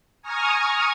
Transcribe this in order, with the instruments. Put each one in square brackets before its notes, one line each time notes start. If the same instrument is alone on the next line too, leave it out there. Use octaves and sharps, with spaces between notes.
[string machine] G#5 A#5 C#6 D#6 F6 G#6